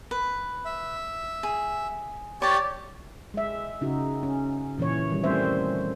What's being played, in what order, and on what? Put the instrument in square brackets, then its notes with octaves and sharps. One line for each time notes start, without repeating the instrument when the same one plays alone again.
[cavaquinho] B4
[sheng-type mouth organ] E5
[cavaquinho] G#4
[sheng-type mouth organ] G4 C#5 D5 [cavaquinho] A5 C#6
[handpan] G#3 E5
C#3 D#4 F#4
C#4
A#2 E3 C#4 C#5
D#3 G3
G3 A3 C4 C#4 C5 E5